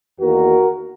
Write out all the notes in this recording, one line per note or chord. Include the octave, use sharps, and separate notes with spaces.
E2 D#3 A#3 F#4 A#4